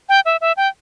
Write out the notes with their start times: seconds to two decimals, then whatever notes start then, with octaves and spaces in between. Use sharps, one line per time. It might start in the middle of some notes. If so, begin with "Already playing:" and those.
0.09 G5
0.25 E5
0.41 E5
0.57 G5